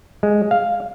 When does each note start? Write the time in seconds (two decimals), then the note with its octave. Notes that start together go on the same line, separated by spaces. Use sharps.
0.23 G#3
0.51 F5